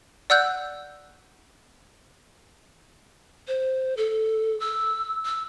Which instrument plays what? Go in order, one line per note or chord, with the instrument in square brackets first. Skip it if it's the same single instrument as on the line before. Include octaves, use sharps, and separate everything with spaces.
[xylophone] D5 F#5 E6 F#6 G6
[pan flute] C5
A4
E6
E6